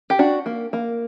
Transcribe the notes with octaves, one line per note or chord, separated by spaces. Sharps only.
G4
D4 F#4
A#3
A#3